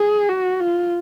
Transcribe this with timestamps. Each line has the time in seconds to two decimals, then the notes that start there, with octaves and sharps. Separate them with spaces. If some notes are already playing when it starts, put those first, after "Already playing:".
Already playing: G#4
0.29 F#4
0.60 F4